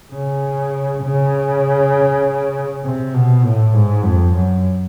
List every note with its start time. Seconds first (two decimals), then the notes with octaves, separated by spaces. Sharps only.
0.13 C#3
1.04 C#3
2.84 C3
3.15 B2
3.44 A2
3.75 G#2
4.04 F2
4.35 F#2